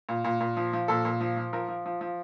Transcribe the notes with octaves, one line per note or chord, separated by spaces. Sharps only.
A#2
A#2
A#2
F3
F3
A#2 A4
A#2
F3
F3
F3 A#4
F3
F3
F3